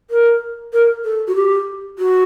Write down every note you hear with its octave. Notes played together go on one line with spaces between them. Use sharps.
A#4
A#4
A4
F#4
G4
F#4